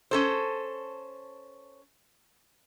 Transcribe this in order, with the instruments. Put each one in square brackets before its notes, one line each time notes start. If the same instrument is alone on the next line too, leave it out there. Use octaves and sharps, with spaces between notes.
[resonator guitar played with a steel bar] C#4 A4 C5